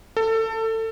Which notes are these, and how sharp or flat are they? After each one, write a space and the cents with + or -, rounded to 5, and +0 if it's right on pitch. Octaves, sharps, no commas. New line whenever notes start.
A4 +25